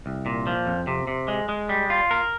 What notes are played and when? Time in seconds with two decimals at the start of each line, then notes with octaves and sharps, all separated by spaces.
0.06 C2
0.26 A#2
0.47 F3
0.67 F2
0.87 C3
1.07 C3
1.28 G#3
1.49 G#3
1.69 G3
1.90 F4
2.11 A#4